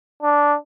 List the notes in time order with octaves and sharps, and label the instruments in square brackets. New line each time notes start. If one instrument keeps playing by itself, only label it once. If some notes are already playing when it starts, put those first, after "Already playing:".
[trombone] D4